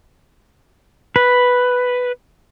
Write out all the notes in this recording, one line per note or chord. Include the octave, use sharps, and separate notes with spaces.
B4